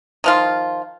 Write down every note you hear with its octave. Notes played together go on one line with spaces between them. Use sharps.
D#3 F3 F4